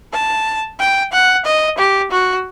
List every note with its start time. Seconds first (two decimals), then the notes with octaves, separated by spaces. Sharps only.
0.13 A5
0.79 G5
1.13 F#5
1.46 D#5
1.78 G4
2.11 F#4